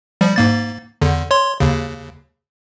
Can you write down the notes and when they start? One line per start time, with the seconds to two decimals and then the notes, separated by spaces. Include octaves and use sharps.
0.21 F3 G3
0.36 G#2 A#3 A6
1.02 E2 D3
1.31 C#5 C6
1.60 D#2 C#3